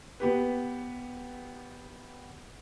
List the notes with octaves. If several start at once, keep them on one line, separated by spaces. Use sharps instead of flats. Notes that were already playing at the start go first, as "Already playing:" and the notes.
B3 G4 B4